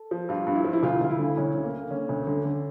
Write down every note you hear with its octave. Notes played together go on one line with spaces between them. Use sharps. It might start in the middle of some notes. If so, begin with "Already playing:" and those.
Already playing: A4
F3
G2 F4
G2
E4
F3
E4
D2 F4
D2 F4
E4
D3
D2 C#4
D3
A#3
D3
D3 C#4
D2
D3
D3